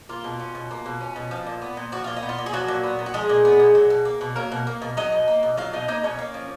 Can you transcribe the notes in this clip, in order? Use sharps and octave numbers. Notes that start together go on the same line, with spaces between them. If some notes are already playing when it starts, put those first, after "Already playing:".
A#3 F4
B2
C#4
B2
A#3
B2
C#4
B2
F3
A#2
B3
A#2
F3 F#4
A#2 F4
D#4
B3
F4
A#2
G#4
F3 F#3 F#4
A#2
B3
A#2
F#4
F3 G#3 G#4
A#2
B3
A#2
F#3
B2
A#3
B2
F#3 A#3 A#4
B2
A#3
B2
F#3 D#4 D#5
B2
A#3
B2
F#3 F4 F5
B2 D#4 D#5
A#3 D#4 D#5
B2 C#4 C#5
A#3
F3